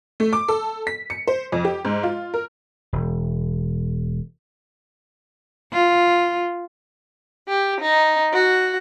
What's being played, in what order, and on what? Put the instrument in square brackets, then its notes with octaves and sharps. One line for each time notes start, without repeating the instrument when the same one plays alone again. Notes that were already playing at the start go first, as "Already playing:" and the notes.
[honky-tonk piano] A3
D6
A4
B6
C#7
C5
F2
G4
G#2
F4
A#4
[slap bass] E1
[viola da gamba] F4
[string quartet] G4
D#4
F#4